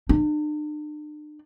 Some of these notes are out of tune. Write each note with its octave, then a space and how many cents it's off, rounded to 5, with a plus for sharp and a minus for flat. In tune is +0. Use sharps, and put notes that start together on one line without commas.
D4 +45